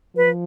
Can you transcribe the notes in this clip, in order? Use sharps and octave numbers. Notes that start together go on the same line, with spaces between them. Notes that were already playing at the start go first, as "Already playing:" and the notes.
F3 B4